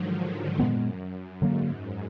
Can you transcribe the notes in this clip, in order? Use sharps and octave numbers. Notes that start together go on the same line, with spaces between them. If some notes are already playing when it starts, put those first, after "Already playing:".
Already playing: G#2 D3 D#3 F3 F#3
D3 F3
F#2 A#2 G#3 B3
G#2 D3 F#3 A#3